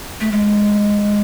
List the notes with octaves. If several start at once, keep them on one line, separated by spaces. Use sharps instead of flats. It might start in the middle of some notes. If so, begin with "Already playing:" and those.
A3
G#3